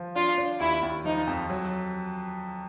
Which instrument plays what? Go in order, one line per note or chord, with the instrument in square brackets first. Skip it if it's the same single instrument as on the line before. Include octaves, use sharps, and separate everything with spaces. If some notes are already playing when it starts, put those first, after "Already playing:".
Already playing: [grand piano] F3
[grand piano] D4 [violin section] F4
[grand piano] D4
[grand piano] D#2 [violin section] E4
[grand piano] D#2
[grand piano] F3 [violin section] D#4
[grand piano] F2
F#3